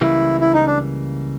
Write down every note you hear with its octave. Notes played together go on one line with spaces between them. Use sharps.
C#2 C#3 E3 G3 A#3 E4
E4
D#4
D4